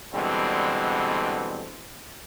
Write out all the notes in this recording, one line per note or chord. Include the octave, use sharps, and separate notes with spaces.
B2 D3 E3 G3 G#3 C4